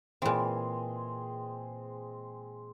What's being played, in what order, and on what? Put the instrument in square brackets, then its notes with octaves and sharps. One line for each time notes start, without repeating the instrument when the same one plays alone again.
[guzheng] A#2 E3 [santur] G#3 C4